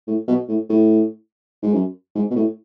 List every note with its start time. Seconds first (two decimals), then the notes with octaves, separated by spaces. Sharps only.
0.07 A2
0.28 B2
0.48 A2
0.69 A2
1.63 G#2
1.73 F#2
2.15 G#2
2.30 B2
2.36 A2